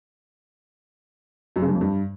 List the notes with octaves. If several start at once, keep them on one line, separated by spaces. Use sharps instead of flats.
F#2
C#3
G2
F2
G2